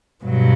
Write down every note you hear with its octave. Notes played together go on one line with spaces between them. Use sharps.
G2 B2 F#3